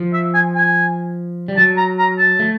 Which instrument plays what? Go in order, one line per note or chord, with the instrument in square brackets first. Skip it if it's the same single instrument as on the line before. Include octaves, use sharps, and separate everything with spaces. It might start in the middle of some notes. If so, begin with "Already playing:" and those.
Already playing: [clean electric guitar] F3
[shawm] E5
G#5
G#5
[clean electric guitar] G3
[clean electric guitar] F#3 [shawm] A5
[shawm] A#5
A#5
A5
[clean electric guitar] A3